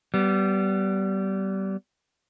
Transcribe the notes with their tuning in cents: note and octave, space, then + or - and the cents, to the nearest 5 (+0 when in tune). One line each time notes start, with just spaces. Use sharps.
G3 -25 B3 +0